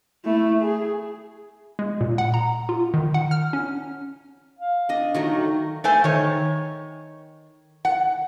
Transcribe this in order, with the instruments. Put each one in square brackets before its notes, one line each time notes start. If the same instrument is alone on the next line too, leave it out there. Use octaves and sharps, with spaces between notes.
[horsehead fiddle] A3 E4
G#4
[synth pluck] G#3
A#2
F#5
A#5
F4
D#3
F#5
F6
C#4
[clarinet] F5
[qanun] D4 D#5
D#3 F#3 A3
[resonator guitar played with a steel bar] A3 A4 C5 G#5
D#3 C#5
F#5